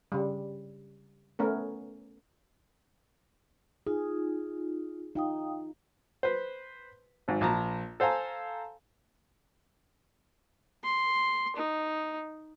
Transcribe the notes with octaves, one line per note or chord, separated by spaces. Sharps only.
C#3 G3
A3 B3 C#4 A#4
D#4 F4 G#4
D#4 F4 F5 G5 D#6
B4 C5
G#1 G#2
A#1 A5 A#5
A4 C5 F5 G#5 A#5
C6
D#4